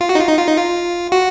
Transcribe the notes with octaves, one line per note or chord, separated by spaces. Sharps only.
F4
F#4
D#4
F4
D#4
F4
D#4
F4
F#4